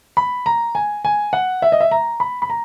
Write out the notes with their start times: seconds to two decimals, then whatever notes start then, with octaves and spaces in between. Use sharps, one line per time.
0.17 B5
0.46 A#5
0.75 G#5
1.05 G#5
1.33 F#5
1.62 E5
1.72 D#5
1.80 E5
1.91 A#5
2.20 B5
2.42 B5
2.50 A#5